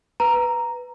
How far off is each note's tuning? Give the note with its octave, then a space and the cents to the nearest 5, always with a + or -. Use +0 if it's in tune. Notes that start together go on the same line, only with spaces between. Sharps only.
B4 +0 A#5 +0